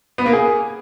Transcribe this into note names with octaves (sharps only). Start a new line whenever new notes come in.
B3
A#3
G#4